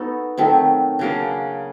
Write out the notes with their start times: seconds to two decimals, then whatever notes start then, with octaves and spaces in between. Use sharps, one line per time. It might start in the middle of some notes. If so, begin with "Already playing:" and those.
Already playing: B3 D#4 F#4 A4
0.37 D#3 F#3 A3 C4
0.99 C#3 F#3 A#3 D4